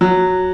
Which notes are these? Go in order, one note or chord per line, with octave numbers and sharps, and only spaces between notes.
F#3